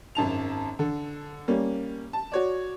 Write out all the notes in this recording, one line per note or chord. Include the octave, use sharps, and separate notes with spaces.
G#1 F#2 A5 F7
D3 A4
G3 A#3 C#4
A5
F#4 C#5 D5